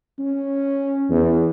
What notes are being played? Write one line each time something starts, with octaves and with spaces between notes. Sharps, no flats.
C#4
E2